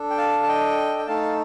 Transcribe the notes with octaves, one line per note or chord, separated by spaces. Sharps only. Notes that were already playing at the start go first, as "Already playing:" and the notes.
Already playing: D4 A4
G5
F5 A5
A5
D#5 G5
G5
A3 D#4 A4 F5 A5